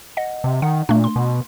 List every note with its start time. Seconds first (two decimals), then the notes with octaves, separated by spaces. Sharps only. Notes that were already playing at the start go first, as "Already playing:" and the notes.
0.17 D#5 F#5
0.44 C3
0.62 D#3 F#5
0.89 A#2 A3 D4
1.04 C6
1.16 B2